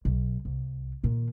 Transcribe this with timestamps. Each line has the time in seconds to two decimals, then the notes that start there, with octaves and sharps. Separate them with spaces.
0.05 B1
0.45 C2
1.03 A#2 D#3